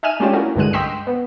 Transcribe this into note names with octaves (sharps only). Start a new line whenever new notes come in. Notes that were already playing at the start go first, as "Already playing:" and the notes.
D#4 E5 G#5 F6 D#7 E7
G#3 A3 C#4 D4 F4 G4
C#4 E4 F#4 A#4
C2 G2 D3 G#3 F#6 D#7
D#5 G5 C6 E6 B6
B3